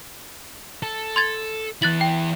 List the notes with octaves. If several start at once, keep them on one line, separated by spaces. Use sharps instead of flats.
A4
C6 G#6 A6
E2 E4 F#6 A6 F#7
G5